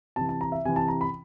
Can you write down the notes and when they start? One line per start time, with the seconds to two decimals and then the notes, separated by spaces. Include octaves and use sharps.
0.16 C3 E3 A5
0.29 A5
0.41 A#5
0.52 E5
0.65 C3 E3 G#5
0.76 A5
0.88 A#5
1.01 B5